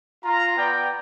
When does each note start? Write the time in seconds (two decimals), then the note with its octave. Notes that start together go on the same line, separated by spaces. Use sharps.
0.24 F4 A#5
0.57 B3 D5 G5